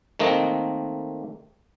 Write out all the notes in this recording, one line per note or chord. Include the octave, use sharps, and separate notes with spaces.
D#3 A3 A#3 C4 D#5